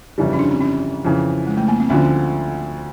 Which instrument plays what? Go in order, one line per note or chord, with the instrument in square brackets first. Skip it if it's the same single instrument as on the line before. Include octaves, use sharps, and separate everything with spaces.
[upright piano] G1 F2 C#3 E3 G3
[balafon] C#4
D4
C4
C#4
[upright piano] F2 C#3 E3
[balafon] G#3
A3
A#3
C4
[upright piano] D2 D3 F3 [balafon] C#4